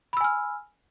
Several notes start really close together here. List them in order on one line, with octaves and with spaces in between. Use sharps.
B5 E6 G#5 F6